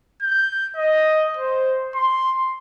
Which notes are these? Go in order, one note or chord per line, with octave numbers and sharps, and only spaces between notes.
G6
D#5
C5
C6